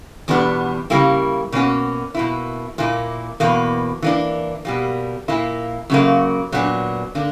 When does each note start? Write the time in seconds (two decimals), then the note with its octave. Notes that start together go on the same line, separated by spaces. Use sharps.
0.28 E2 B2 G3 B3 D4
0.90 C#3 G3 A#3 E4
1.52 B2 A#3 C#4 F#4
2.15 B2 A#3 E4
2.78 A#2 A#3 E4
3.40 E2 B2 A#3
4.02 E3 A#3 D4
4.65 B2 G3 A#3
5.28 A#2 A#3 E4
5.90 F#2 C#3 F#3 A#3
6.52 A#2 F#3 B3 D4
7.15 D3 A#3 D4